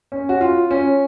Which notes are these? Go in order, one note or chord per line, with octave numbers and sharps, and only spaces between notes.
C#4
F#4
F4
C#4